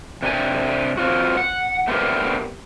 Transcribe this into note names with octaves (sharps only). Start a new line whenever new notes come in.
C3 D4 G4 A#4 G#5
C4 F4 F#4
F#5
A3 B3 C4 D4 G4 A#4